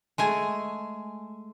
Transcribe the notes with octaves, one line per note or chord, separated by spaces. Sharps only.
G#3 A3 G#5